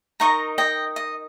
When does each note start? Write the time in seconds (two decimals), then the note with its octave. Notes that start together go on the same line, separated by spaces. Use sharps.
0.20 D#4 A#4 D#5 A#5 C#6
0.58 D#5 G5
0.96 D#5